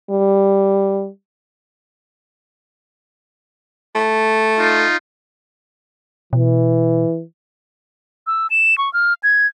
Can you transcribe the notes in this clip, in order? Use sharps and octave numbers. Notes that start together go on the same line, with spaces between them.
G3
A3
D#4 F4
B2 E3
E6
E7
C#6
F6
G#6